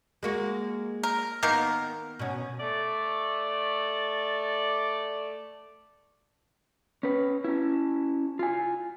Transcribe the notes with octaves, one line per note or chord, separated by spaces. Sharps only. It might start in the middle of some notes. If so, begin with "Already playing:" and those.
G#3 A#3 F#4
A#4
D#3 A#3 B3 A#4
B2 C#4
A3 D5
C#4 B4
C#4 E4
F4 G#5